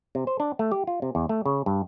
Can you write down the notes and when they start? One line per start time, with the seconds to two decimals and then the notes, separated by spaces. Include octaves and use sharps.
0.15 C3
0.27 C5
0.40 D4
0.59 A3
0.72 G4
0.87 F4
1.02 C3
1.15 E2
1.29 A3
1.46 C#3
1.66 G2